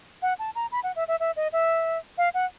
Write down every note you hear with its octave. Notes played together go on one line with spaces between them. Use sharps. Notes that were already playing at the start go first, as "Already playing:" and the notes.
F#5
A5
A#5
B5
F#5
E5
E5
E5
D#5
E5
F5
F#5